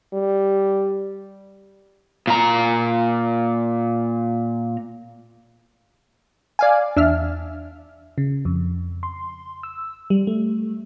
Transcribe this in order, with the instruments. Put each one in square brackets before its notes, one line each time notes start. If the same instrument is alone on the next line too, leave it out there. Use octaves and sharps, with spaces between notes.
[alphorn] G3
[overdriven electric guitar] A#2 A#5
[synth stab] D5 F5 G#5
[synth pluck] E2 E5 F6 [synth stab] D4
[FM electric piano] C#3
F2
C6
E6
G3
A3